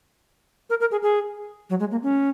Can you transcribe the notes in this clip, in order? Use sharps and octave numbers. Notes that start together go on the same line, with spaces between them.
A#4
A#4
G#4
G#4
F#3
G#3
A#3
C#4